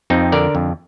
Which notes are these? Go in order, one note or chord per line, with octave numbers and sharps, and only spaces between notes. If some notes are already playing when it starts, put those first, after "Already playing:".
F2 C4 D#4
D3 A#4 D5
F2